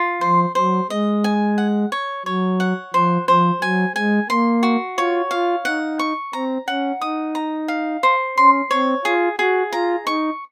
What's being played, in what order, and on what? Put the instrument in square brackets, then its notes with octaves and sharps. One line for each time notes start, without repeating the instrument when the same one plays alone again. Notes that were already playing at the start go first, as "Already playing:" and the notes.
Already playing: [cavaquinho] F4
[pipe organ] F3 [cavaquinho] C5
[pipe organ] F#3 [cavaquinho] C5
[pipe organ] G#3 [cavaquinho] D#5
[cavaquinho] G#5
F#5
C#5
[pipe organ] F#3 [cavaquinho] C#5
[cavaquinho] F#5
[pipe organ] F3 [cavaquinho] C5
[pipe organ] F3 [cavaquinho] C5
[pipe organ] F#3 [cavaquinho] G#5
[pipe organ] G#3 [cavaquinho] G#5
[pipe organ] A#3 [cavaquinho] C6
[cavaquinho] F#4
[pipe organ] F4 [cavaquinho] C#5
[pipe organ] F4 [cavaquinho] F5
[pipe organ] D#4 [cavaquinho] F#5
[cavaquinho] C#6
[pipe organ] C4 [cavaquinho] A#5
[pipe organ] C#4 [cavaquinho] F#5
[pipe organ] D#4 [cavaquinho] D#6
[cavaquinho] A#5
F5
C5
[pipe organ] C#4 [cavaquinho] C6
[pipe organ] C4 [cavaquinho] C#5
[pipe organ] F4 [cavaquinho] G#4
[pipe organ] F#4 [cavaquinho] G#4
[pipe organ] F4 [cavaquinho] A#5
[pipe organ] D#4 [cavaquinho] C#6